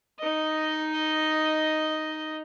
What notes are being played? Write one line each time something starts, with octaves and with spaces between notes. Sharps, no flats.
D#4 D#5